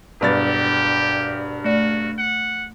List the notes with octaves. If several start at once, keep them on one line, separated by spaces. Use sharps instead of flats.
E1 G2 G4 B4 A6
A3 F#4 D5
F#5